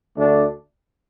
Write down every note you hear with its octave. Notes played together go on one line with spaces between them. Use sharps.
D2 D3 A3 D4